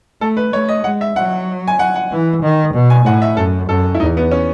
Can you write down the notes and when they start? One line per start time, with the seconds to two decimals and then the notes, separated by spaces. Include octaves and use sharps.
0.21 A3 A4
0.37 B4
0.53 A3 C#5
0.69 D#5
0.84 G#3 F#5
1.01 E5
1.16 F#3 F#5
1.68 G#5
1.79 F#5
1.96 F#5
2.11 E3
2.42 D#3
2.74 B2
2.90 G#5
3.05 A2 F#5
3.22 E5
3.37 F#2 A4
3.69 F#2 A4
3.95 E4
4.00 E2 D#4
4.17 B3
4.32 C#4